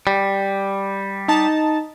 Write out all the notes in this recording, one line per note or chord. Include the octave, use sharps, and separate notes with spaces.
G3
D#4 A5